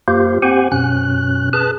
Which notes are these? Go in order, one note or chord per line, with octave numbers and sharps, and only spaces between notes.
F#2 A#3 F4 G4 C5
C4 G4 C5 F#5 G#5
F#2 B2 C#4 F#6
G#4 B4 A5 F#6